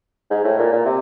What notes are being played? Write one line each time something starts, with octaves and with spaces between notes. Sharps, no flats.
G#2
A2
A#2
A#2
C3